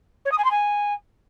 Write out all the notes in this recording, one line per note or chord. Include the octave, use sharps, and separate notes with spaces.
C#5
D#6
G#5
C6
G#5